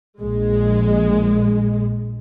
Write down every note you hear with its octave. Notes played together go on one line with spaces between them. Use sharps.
A#1 G#3